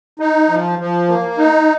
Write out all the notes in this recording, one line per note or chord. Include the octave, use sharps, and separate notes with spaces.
D#4
F3
F3
A#3
D#4